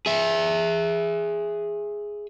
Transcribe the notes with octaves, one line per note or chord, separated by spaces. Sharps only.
G#4 E5